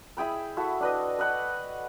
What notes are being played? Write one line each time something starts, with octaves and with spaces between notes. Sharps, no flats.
E4 G#4 G5 B5
E4 F#4 A4
D4 B4 D#5
B4 D#5 F#5 B5